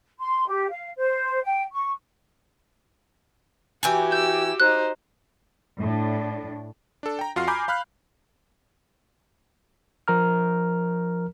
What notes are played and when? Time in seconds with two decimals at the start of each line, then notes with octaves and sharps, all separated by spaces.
0.19 C6
0.47 G4
0.69 F5
0.97 C5
1.44 G5
1.72 C#6
3.83 E3 F#4 G4 G5 G#5
4.12 E6 G6
4.60 D#4 C5 F#6
5.79 A2 D4
7.03 D4 A4
7.19 G5 A#5
7.36 F2 F4 F#4 C6 F6 C7
7.47 G#5 A#5 B5 D6 G6
7.68 F5 B5 F6 F#6
10.08 F3 A#4 A#5 F6